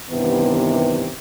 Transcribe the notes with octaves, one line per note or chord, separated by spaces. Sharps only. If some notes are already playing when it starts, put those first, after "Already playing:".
G2 C3 D#3 E3 B3